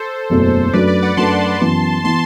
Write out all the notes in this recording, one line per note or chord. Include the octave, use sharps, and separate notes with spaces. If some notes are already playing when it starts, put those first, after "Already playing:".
Already playing: A4 C5
F#1 E2 B2 A3
F#2 F#3 A3 D4 B4 D5
B4 D5
D5 F#5
F#2 F#3 A3 D4 A5 C6
F#2 E3 B3
E3 B3 A5 C6